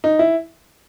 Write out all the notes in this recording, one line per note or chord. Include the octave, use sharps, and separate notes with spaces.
D#4
E4